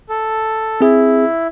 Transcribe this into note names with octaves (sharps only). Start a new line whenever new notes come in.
A4
C4 E4 G#4